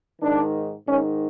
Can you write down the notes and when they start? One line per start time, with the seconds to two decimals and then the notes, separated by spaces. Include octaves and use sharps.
0.21 G#2 D#3 D4
0.87 G#2 D#3 C#4